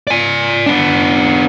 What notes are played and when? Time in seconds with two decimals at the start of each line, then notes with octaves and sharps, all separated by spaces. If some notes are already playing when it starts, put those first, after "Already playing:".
0.07 D5 G#5
0.66 B3 D4